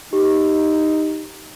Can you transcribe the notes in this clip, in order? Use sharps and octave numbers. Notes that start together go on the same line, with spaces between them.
D#4 G4